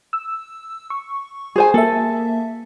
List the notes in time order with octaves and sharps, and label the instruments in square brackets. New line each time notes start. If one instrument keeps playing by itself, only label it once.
[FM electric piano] E6
C#6
[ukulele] G#4 C5 G#5
[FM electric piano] A#3 E5 [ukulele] A4